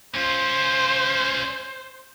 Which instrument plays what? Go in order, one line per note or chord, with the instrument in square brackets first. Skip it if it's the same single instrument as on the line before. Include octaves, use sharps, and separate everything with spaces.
[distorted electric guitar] C#4 F4 [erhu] C5